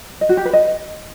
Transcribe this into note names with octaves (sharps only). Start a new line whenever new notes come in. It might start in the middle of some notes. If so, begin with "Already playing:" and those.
D#5
F#4
G4
B4
D#5